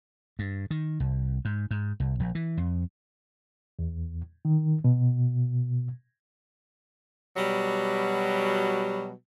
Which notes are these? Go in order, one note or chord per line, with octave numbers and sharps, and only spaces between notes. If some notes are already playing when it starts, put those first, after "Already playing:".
G2
D#3
C2
G#2
G#2
C2
A#1
E3
F2
E2
D#3
B2
B2 F#3 G3